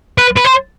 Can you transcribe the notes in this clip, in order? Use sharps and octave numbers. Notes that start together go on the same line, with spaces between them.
B4
B4
C5